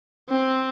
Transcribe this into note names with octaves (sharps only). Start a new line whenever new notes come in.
C4